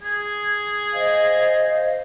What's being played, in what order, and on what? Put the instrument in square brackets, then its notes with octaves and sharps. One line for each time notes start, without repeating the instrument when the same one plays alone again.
[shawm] G#4 [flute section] G#6
[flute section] C5 D#5 F5